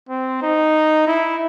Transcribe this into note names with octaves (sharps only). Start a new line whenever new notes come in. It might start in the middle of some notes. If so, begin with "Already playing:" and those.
C4
D#4
E4